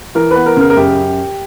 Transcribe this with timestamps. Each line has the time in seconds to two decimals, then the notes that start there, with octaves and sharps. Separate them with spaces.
0.15 E3 A#4
0.31 B3 B4
0.46 A#4
0.57 C#3 A#4
0.70 A#4
0.77 F#2 G4